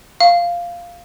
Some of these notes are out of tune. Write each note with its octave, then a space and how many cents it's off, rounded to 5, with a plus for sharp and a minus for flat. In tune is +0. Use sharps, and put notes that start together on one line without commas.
F5 -5